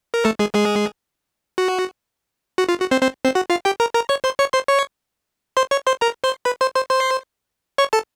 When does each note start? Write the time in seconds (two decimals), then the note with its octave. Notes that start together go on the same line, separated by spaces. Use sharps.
0.14 A#4
0.25 A3 A4
0.39 G#3 G#4
0.55 G#3 G#4
1.58 F#4
2.58 F#4
2.69 F4
2.80 F#4
2.91 C4 C5
3.02 C4 C5
3.24 C4 C5
3.35 F#4 F#5
3.50 F4 F5
3.65 G4 G5
3.80 A#4 A#5
3.94 A#4 A#5
4.09 C#5 C#6
4.24 C5 C6
4.39 C#5 C#6
4.53 C5 C6
4.68 C#5 C#6
5.57 C5 C6
5.71 C#5 C#6
5.87 C5 C6
6.01 A#4 A#5
6.24 C5 C6
6.45 B4 B5
6.61 C5 C6
6.75 C5 C6
6.90 C5 C6
7.78 C#5 C#6
7.93 A4 A5